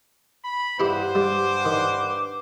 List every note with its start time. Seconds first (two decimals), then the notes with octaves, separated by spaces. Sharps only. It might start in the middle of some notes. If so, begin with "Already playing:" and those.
0.44 B5
0.80 G2 E4 G4 B4 C5 F#5
1.15 G3 D6
1.65 D#3